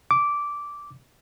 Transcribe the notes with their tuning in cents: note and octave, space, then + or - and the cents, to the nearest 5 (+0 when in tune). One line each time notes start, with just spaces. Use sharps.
D6 -10